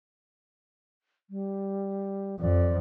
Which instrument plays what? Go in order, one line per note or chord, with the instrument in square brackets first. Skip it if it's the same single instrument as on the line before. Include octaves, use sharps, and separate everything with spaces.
[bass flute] G3
[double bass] F2 [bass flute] D5